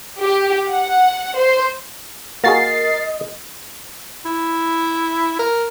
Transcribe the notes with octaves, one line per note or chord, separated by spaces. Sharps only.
G4
F#5
C5
A#3 F#4 G#4 A#4 D#5 A6 C7
E4
A#4